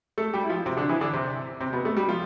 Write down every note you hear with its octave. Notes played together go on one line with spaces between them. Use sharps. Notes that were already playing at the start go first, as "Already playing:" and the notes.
A3 A4
G3 G4
E4
F3 F4
C3 C4
D3 D4
E3 E4
D3 D4
C3 C4
C3 C4
B2 B3
A3
G3
F3 F4